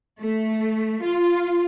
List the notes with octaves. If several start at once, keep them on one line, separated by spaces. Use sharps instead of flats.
A3
F4